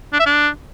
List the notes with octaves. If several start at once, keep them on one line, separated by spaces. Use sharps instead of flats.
D4
E5
D4